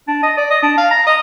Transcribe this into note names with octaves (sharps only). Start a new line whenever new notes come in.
D4
D#5
D5
D#5
D4
F5
A#5
D#5